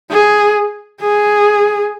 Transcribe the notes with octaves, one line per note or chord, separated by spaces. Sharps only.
G#4
G#4